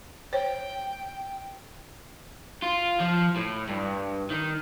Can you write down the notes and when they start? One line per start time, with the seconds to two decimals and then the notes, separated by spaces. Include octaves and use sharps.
0.33 C5 C#5 G5
2.62 F4
3.00 F3
3.36 A2
3.69 G2
4.30 D#3